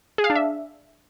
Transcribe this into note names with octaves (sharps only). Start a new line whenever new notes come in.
G#4
F5
D4
E5